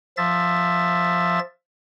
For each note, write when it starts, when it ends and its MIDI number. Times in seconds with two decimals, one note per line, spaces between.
0.17 1.39 53
0.17 1.39 76
0.17 1.39 93